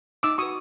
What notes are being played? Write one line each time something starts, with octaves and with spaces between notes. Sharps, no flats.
D#4 D6 E6
F#4 B4 C#6 D#6